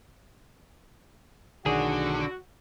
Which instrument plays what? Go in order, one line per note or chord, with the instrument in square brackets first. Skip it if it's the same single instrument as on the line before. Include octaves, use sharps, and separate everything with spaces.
[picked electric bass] B1 D#3 [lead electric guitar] D3 [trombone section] F#4 [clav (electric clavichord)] G#4